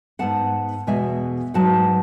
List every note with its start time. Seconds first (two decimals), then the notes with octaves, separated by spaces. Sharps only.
0.19 G#2 G#3 B3 F#5 A5
0.87 E2 B2 G#3 E5 G#5
1.54 G#2 F#3 B3 F#5 A5